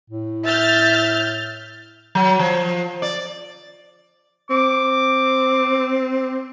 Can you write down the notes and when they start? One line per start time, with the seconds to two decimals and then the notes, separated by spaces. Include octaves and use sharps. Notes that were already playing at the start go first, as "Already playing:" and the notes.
0.10 A2
0.45 E5 F6 G6 A6
2.15 F#3
2.39 F3
3.02 D5
4.50 C4 D6